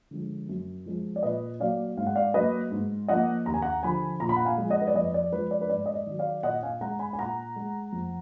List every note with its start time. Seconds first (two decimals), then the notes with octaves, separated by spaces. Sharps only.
0.11 D3 F3 G#3
0.49 F#2
0.86 F3 G#3
1.16 D5
1.23 A#2 B4 D#5
1.60 F#3 A#3 D5 F5
1.97 G#2 F5
2.06 F#5
2.16 D5 F5
2.34 F#3 A#3 B4 D#5
2.71 G#2
3.08 F3 A#3 D#5 F#5
3.46 D#2 A#5
3.54 G#5
3.62 F#5 A#5
3.83 D3 F3 G#5 B5
4.20 A#2 A#5
4.29 B5
4.36 F#5 A#5
4.45 F5 G#5
4.58 F3 G#3
4.70 D#5 F#5
4.81 B4
4.87 D5
4.94 F2 B4 D#5
5.14 D5
5.32 F3 G#3 B4
5.51 D5
5.61 B4
5.69 G#2 D5
5.86 D#5
5.94 D5
6.06 D#3 F#3
6.19 D5 F5
6.43 A#2 D#5 F#5
6.63 F5 G#5
6.81 G#3 F#5 A#5
6.99 G#5 B5
7.13 G#5
7.19 A#2 F#5 A#5
7.56 G#3
7.93 F2